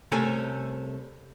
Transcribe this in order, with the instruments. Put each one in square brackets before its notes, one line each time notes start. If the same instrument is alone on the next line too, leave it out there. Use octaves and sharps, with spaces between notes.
[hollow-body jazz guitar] C2 C3 A3 C#4 A4 G#5